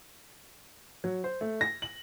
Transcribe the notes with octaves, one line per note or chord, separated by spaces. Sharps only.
F#3
C5
A3
A#6
F#7